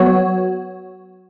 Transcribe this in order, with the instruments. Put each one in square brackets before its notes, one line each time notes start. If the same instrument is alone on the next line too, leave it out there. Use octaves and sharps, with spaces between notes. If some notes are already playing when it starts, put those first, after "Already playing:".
Already playing: [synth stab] F#3 B3 F#4 C#5